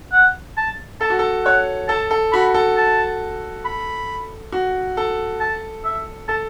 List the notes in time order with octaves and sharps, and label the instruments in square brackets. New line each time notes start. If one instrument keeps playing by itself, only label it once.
[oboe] F#5
A5
[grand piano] A4 [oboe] A5
[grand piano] F#4
A4
[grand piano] C#5 [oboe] F#5
[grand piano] A4 [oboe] A5
[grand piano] A4
[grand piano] F#4 [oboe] B5
[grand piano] A4
[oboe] A5
B5
[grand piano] F#4
A4
[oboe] A5
E5
[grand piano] A4 [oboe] A5